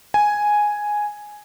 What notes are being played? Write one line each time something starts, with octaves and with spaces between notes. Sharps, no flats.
G#5